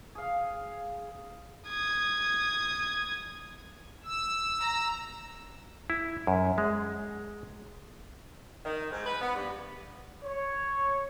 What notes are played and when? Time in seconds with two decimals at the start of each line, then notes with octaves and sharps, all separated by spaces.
0.15 G#4 F5
1.69 D#6 G#6
4.04 E6
4.60 A#5
5.90 E4
6.27 F#2
6.58 G#3
8.64 D#3
8.91 G#2
9.05 B4
9.21 B3
9.34 G2
10.24 C#5